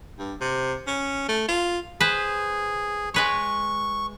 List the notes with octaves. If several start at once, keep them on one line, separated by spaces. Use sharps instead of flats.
G2
C3
C#4
A3
F4
G#4 B4 C5
G#3 B4 C#5 C#6